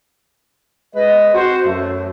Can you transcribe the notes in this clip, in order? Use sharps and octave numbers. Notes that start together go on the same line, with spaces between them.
G#3 B4 D#5
C4 F#4 C5
F#2 A3